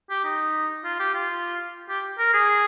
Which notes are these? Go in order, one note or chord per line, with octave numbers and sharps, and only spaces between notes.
G4
D#4
F4
G4
F4
G4
A#4
G#4